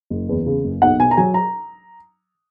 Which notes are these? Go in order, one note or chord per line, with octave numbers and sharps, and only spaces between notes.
F#1
E2
C#3
F#1
B1 F#5
B2 G#5
A#5
F#3 G#5
A#5